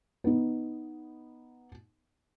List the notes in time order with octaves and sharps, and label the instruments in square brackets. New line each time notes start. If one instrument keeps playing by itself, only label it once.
[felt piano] B3 D#4